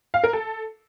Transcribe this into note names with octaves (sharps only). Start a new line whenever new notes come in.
F5
A#4
A4